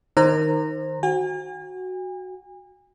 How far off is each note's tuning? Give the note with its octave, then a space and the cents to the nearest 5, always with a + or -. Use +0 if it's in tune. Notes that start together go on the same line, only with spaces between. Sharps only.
D#3 +0 C5 +20 A#5 -15
F#4 +0 G#5 -40